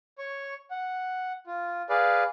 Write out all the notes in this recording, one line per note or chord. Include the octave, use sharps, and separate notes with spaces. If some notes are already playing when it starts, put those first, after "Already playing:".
C#5 C#6
F#5
F4
G#4 B4 D5 F5